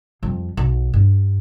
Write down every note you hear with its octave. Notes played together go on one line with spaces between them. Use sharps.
F2 G3
B1
G2